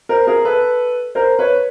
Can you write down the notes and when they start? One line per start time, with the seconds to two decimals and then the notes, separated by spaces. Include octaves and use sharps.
0.09 A#4 C5
0.27 G#4 A#4
0.45 A4 B4
1.15 A#4 C5
1.39 B4 C#5